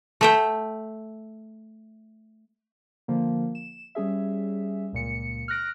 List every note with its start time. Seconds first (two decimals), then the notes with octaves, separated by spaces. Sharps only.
0.21 A3 E5 G5
3.08 D3 F3 A#3
3.55 E7
3.95 G3 C#4 G#4 E5
4.93 C#2 A#2 C#7
5.48 F6 F#6 A#6 D7